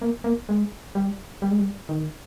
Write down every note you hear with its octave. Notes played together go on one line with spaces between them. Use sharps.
A#3
A#3
G#3
G3
G3
G#3
G3
D#3